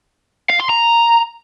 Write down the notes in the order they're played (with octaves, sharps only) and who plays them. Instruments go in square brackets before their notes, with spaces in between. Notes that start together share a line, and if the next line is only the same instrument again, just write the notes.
[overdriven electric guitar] F5
C6
A#5